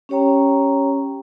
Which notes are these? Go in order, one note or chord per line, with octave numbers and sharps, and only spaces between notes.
C#4 G4 C#5 G5 A#5